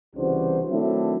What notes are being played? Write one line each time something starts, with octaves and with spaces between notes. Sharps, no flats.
C2 C#3 E3 D4 F#4 C5
D#3 F#3 A3 C4 D4 E4